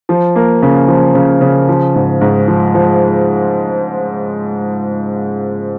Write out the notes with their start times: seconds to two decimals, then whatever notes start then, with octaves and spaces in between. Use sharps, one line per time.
0.09 F3
0.36 A#3
0.62 C#3
0.88 F3
1.15 C#3
1.41 C#3
1.68 F3
1.95 G#2
2.21 G#2
2.48 F3
2.74 F3